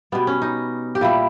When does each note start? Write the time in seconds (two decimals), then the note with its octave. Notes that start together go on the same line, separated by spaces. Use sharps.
0.12 B2 G3 B3
0.27 C#4
0.42 D#4
0.95 G4
1.01 A#2 G3 E4